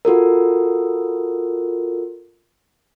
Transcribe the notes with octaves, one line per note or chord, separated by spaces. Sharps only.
F4 F#4 A4 A#4